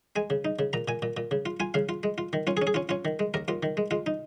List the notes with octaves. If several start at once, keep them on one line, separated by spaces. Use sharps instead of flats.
G#3 G#5
C#3
D#4
C#3
A#2 A#5
A#2 G#5
A#2
A#2
C#3
F4
F4 G#5
C#3 F5
F4
G#3
F4
D#3
C#4 F4
G#4
C#4
G#4
C#4 F4
C#4 F4
D#3
G#3
D#2 A#4
D#2 F4
D#3
G#3
G#3 F4
D#4